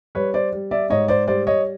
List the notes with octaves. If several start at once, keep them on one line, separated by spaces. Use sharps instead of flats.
G3 B4 C#5
C5 D5
G3
D5 E5
G#2 C#5 D#5
C5 D5
G3 C5 D5
C#5 D#5